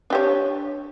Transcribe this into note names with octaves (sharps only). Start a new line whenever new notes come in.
D4 G4 C#5